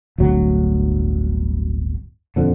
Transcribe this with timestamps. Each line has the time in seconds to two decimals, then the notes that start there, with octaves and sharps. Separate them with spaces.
0.18 D1 G1 D2 F#3
2.36 D#1 F2 D3